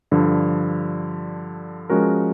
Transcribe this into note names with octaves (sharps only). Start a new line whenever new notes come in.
G2 D3 F3
F3 G#3 C#4 F#4 A#4